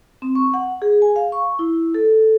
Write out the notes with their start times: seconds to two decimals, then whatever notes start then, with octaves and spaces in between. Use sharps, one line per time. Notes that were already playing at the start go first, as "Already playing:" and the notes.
0.22 C4
0.35 C#6
0.54 F#5
0.82 G#4
1.02 G#5
1.16 F5
1.32 C#6
1.59 E4
1.94 A4